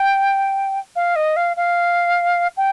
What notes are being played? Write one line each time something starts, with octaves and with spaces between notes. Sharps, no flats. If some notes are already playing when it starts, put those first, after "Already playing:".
Already playing: G5
F5
D#5
F5
F5
G5